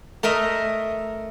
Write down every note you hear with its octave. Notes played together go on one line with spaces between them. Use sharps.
A3 A#4 D#5 E5 A#5